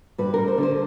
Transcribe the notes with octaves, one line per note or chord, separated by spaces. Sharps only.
G2 B4
G3 A#4
C5
D3 C5